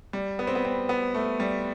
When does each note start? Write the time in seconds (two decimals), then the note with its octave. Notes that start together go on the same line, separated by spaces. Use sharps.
0.13 G3
0.39 B3
0.47 C4
0.55 B3
0.65 C4
0.89 B3
1.14 A3
1.40 G3